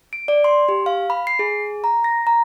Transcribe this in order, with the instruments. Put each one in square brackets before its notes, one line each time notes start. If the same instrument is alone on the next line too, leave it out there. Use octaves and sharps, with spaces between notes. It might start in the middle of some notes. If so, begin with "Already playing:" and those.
[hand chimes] D7
D5
C6
G4
F5
B5
C7
G#4
A#5
A#6
A#5